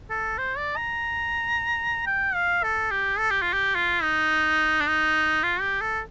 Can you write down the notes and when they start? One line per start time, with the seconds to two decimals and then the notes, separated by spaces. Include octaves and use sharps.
0.10 A4
0.38 C5
0.58 D5
0.77 A#5
2.07 G5
2.35 F5
2.63 A4
2.91 G4
3.19 A4
3.31 G4
3.42 F4
3.53 G4
3.75 F4
4.03 D#4
4.81 D4
4.88 D#4
5.43 F4
5.61 G4
5.81 A4